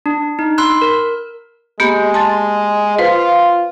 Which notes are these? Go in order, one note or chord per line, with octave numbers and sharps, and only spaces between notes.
D4
D#4
B5 C6 E6 F#6
A#4
G#3 A#3 B3 G4
A5 C6 A6
F4 B4 C5